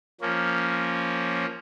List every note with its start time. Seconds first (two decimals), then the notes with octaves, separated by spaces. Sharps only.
0.21 F3 A#3 C#4